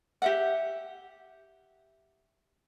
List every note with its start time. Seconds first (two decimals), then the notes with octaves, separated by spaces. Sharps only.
0.22 G4 E5 F#5